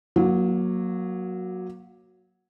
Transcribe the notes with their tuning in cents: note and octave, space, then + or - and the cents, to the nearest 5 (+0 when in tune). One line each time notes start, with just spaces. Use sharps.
F#3 -10 A#3 +15